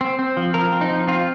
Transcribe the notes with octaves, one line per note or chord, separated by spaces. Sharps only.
C4
C4
F3
F3 A#4
C4
D#4
F3
C4 F4